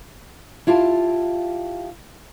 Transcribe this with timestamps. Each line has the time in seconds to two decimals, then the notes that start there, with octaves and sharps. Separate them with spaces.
0.67 E4 F4 G4 F5 A5